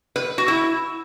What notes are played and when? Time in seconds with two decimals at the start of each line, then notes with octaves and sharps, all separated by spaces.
0.16 B4
0.38 F#4
0.48 E4